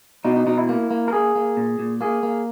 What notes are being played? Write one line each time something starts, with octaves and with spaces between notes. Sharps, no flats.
B2 D#4
D#4
B2 D#4
E4
A#3
A#3
A#4
A#3 G#4
A#3
A#2
A#2
A#3 G#4
A#3